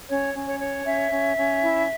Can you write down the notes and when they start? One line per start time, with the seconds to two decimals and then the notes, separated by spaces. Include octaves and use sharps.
0.08 C#4 C#5
0.34 C#4
0.47 C#5
0.59 C#5
0.85 C#4 E5
1.10 C#4
1.36 C#4
1.62 E4